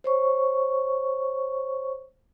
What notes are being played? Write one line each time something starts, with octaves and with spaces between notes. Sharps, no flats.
C5 C#5 C#6